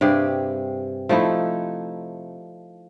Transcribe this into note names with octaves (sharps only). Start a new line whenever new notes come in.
G2 C3 G4 G#4
F3 A3 D#4 E4